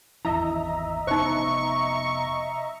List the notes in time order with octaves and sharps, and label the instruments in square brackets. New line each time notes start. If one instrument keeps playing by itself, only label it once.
[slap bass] G#1 E2 F3 [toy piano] E4 [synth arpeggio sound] D#5 E5 A#5
[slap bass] F1 B3 [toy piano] D#4 C5 [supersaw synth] C#6